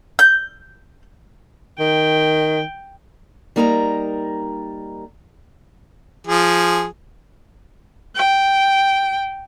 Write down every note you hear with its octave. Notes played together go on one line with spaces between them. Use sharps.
G6
D#3 G5
G3 A#3 D#4 A#4 G#5 A#5
F3 G#4
G5